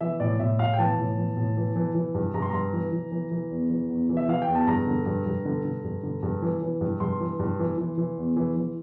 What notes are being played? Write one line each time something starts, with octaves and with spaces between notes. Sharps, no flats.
E3 E5
A2 D5
A2 E5
A2 F5
G5
E3 A5
A2
E3
A2
E3
E3
E3
G2
G2 A#5
C6
G2 A#5
E3
E3
E3
E3
E2
E3
E2
E3
E5
E3 F5
G5
E2
A5
G2 A#5
D3
G2
G2
D3
D3
G2
D3
G2
E3
E3
G2
G2 C6
E3
G2
E3
E3
E3
E2
E3
E3